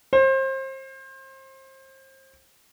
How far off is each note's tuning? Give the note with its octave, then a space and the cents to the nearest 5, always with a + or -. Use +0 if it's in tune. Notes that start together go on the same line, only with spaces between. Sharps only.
C5 +30